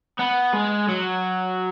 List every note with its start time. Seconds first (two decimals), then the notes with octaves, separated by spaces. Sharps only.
0.19 B3
0.53 G#3
0.88 F#3